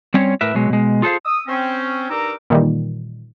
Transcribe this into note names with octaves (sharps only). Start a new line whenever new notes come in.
G3 C4 C#4 C#5
A2 A#4 B4 E5
B2 F#3 G#3
B2 G#3
F4 G#4 A4 B4 C5 F5
D#6 E6
C4 C#4
G2 D#4 A#4 A#5 D6 E6
A#2 D#3 E3 G3